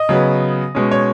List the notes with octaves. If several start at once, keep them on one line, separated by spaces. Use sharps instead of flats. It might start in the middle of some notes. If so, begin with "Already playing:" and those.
Already playing: D#5
C#3 F#3 B3
B2 G#3 C#4
C#5